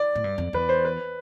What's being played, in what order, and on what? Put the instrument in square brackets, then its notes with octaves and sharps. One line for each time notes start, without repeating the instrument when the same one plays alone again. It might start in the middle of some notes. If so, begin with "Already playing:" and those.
Already playing: [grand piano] D5
[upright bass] A2
G2
F2
[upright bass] E2 [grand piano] B4
[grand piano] C5
B4